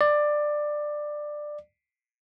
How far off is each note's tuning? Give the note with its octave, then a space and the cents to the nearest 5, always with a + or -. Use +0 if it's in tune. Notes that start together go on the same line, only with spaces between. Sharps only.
D5 +15